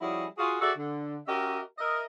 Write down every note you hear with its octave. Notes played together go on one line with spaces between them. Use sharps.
F3 G3 C#4 E4 F#4 G#4
F4 F#4 G#4
F#4 G#4 A4 D5 E5
D3
C#4 F#4 G4 A#4 D#5 E5
A#4 D#5 E5